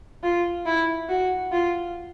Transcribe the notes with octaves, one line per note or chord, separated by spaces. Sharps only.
F4
E4
F#4
F4